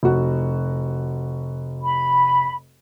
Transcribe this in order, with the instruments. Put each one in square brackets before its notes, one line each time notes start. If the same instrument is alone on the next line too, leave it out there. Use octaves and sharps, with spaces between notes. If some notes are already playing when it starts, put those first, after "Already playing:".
[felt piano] F1 F#4
[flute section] B5